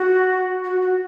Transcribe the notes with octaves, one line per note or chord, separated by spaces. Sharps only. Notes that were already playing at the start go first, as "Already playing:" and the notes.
Already playing: F#4
F#4
F#4